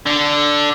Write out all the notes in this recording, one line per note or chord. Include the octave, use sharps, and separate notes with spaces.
D3